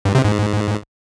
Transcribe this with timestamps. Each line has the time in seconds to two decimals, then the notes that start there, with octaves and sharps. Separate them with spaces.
0.05 G2
0.15 C3
0.25 G#2